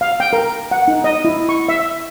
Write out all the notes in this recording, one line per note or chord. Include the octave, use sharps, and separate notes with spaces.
F5
G5
A#4
F#5
D#4
D#5
E4
C#6
E5